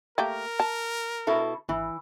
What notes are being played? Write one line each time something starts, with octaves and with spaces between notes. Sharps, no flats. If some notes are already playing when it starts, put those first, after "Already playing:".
A3 A#3 G4 A#4
A5
B2 E4 A4
G#1 E3